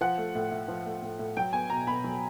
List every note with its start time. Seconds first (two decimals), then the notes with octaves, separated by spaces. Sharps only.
0.01 F3 F#5
0.18 A3
0.35 A2
0.52 A2
0.68 F3
0.86 A3
1.02 A2
1.19 A2
1.37 F#3 G5
1.53 B3 G#5
1.70 B2 A#5
1.87 B2 B5
2.04 F#3